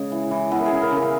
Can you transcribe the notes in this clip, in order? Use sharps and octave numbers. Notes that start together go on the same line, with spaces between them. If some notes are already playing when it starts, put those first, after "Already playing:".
Already playing: C#3 G#3
E3
E3
B3 E4
A#4
G#4
C#3
A#4
C#3
A#4